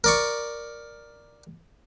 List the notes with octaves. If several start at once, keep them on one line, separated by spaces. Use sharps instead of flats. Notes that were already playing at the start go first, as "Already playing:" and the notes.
A#4 D5 C#6